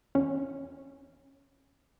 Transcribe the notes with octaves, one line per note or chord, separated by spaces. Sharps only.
E2 C#4